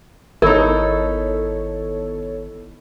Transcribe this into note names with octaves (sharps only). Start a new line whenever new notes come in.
G#1 D#3 B3 D#4 E4 A4 A#4 C#5